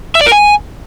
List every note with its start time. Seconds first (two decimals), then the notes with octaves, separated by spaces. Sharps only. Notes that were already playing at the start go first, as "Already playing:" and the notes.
0.15 E5
0.21 D5
0.26 A#4
0.32 G#5